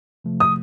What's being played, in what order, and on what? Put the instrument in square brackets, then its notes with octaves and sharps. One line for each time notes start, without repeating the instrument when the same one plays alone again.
[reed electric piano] C3 F3 A3
[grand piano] D#6